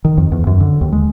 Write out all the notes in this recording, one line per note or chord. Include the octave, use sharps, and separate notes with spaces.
D#3
F2
E2
F#2
D3
D#2
G#3